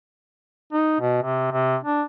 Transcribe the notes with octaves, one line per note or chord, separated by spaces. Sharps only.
D#4
B2
C3
C3
D4